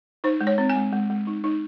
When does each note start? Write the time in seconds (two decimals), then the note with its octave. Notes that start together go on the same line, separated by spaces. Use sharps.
0.24 D#4 C5
0.41 G#3
0.47 C#5
0.58 C4
0.70 G#5
0.76 G#3
0.93 G#3
1.10 G#3
1.27 D#4
1.44 D#4